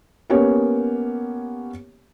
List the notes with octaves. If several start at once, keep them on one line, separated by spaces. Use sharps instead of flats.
A#3 B3 C#4 G4 C#5